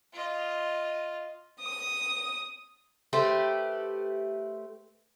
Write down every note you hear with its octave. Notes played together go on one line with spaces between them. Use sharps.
F4 D#5
D#6
A3 G4 B4 C5